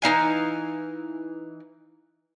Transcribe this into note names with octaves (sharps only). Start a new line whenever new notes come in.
E3 D#4 F5 G#5